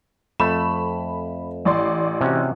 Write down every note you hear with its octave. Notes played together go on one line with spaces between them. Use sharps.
F2 A3 B5 E7
A1 D5 C6
C3 C#4 F#4